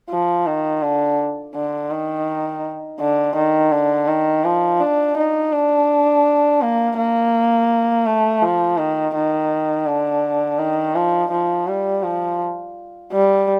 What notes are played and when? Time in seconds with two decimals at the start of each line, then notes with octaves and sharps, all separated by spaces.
0.10 F3
0.46 D#3
0.82 D3
1.55 D3
1.91 D#3
3.00 D3
3.36 D#3
3.72 D3
4.08 D#3
4.44 F3
4.80 D4
5.17 D#4
5.53 D4
6.62 A#3
6.97 A#3
8.06 A3
8.42 F3
8.78 D#3
9.15 D#3
9.87 D3
10.59 D#3
10.95 F3
11.31 F3
11.67 G3
12.04 F3
13.12 G3